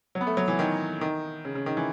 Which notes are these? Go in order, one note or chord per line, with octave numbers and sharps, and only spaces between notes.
F#3
B3
A3
F#3
E3
D#3
D#3
C#3
C#3
D#3
E3